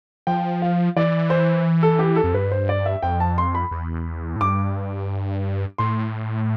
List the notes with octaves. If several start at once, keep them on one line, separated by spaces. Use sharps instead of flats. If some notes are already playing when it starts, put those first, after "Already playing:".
F3 G5
F5
E3 D5
C5
A4
G4
A4
F2
G2 B4
C5
D5
E5
F2 G5
A5
C6
B5
E2
A2
G2 D6
A2 C6